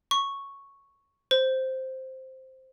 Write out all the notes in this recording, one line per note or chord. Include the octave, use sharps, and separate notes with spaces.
C#6
C5